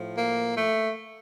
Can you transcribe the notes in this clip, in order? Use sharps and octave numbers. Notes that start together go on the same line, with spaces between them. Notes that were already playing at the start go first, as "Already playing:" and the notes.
Already playing: A2 F3
A#3
A3